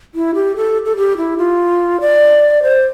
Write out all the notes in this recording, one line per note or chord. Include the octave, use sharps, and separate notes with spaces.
E4
G4
A4
A4
G4
E4
F4
D5
C5